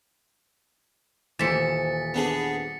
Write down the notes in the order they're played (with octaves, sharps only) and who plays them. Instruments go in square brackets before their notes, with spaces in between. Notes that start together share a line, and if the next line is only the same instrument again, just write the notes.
[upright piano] D#1 E7 [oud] E3 C5 [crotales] A6 B6 C#7
[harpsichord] B3 D4 G#4